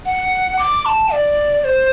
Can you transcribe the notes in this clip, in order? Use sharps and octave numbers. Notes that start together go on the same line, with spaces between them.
F#5
D6
A5
D5
C5